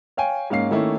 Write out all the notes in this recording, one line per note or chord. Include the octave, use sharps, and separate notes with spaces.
C#5 F5 G5 G#5
G#2 A#3 C#4 F5 C7
D#3 A3 A#3 C#4 E4